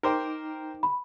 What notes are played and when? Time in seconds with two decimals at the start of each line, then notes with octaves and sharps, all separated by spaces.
0.03 D#4 A#4 C5 G5 D6
0.83 B5